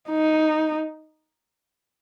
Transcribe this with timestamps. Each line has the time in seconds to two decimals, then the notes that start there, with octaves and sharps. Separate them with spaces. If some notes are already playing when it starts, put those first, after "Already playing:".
0.10 D#4